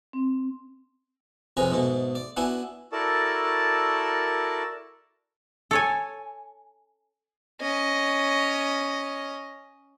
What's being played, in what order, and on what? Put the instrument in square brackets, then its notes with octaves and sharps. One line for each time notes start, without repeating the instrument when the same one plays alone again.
[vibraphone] C4
[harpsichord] F2 C3 C#4 G#4 B4 A#5
G#2 B2 A3
D5
B3 D4 E4 F#4 G#5
[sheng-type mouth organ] E4 F#4 A4 A#4 D5 A5
[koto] A4 C#5 G#5
[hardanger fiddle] C#4 D#5